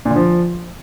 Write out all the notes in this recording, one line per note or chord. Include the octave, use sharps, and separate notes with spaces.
A#2
D3
F3